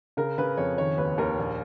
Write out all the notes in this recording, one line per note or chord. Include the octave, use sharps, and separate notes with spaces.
C#3 A#4
C#3 B4
F2 C#5
D#3 C#5
D#2 B4
D#2 A#4
A#1